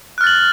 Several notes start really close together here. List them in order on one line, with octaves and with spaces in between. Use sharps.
F#6 F6 A6 F#7